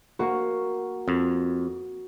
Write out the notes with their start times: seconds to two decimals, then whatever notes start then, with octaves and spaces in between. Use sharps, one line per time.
0.19 A#3 F#4
1.08 F2